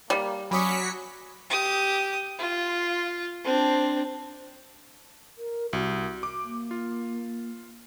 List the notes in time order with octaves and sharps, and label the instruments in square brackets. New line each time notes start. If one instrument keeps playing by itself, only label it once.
[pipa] G3 [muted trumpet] A#3
[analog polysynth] F#3 B6 C#7 [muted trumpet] C#4 [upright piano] B5 D6 D#6
[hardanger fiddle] G4 D#6
F4
C4 D4
[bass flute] A#4
[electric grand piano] C2 [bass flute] F#4
[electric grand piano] D6
[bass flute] A#3
[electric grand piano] F4